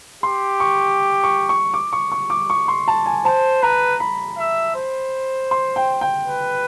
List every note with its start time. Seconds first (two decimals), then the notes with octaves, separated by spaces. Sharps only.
0.23 G4 C6
0.60 C#6
1.24 C#6
1.49 C#6
1.74 D6
1.93 C#6
2.12 C#6
2.30 D6
2.50 C#6
2.68 C6
2.88 A5
3.06 G#5
3.25 C5 A5
3.62 B4 A#5
4.00 B5
4.38 E5
4.76 C5
5.51 C6
5.76 G5
6.01 G5
6.27 B4